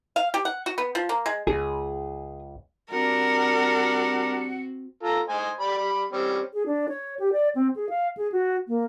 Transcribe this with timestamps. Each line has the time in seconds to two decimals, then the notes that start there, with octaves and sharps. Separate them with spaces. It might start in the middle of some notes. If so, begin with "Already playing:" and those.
0.16 F5
0.34 G4
0.45 F#5
0.66 F#4
0.78 B3
0.95 F3
1.09 A#3
1.26 G#3
1.47 C#2 G#4
2.91 G3 C4 D4 F#4 A#4 F#5
5.03 F4 A4 A#5
5.29 C5 D#5 G#5
5.60 G4 D5 B5
5.78 G3 B5
6.13 G3 C4 C#4
6.53 G#4
6.66 D4
6.89 C#5
7.19 G4
7.32 D5
7.55 C4
7.76 G#4
7.89 F5
8.17 G#4
8.32 F#4
8.68 A#3